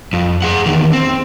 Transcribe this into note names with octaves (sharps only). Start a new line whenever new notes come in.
F2
G#4 F#5
E2 D#3
C4